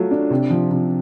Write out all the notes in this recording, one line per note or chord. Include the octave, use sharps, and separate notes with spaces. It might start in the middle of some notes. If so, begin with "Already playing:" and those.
Already playing: F#3 A3 F4
D4
C3
F3
C3